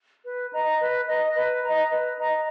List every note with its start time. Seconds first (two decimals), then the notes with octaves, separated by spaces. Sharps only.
0.24 B4
0.52 D#5 A#5
0.79 B4
1.07 D#5 A#5
1.35 B4
1.62 A#5
1.67 D#5
1.90 B4
2.18 D#5 A#5